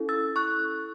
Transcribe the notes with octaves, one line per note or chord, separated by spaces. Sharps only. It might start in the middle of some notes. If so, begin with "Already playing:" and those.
Already playing: C#4 E4 A4
E6 A6
C#6 F#6